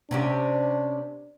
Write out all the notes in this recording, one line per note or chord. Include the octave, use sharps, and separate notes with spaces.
C3 C#4 D4 G4